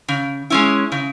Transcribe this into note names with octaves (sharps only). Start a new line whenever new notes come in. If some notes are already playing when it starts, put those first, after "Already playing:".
C#3
G#3 C#4 E4
C#3